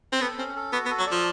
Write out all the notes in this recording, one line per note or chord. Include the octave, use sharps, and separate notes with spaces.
C4
B3 A4
C4 C#4
A4
B3 F#4
B3
A4
F#3
F3 D5